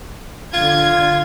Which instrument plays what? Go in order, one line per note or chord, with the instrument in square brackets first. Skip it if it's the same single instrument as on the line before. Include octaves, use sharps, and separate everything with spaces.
[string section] D3 G#6 [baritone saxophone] F4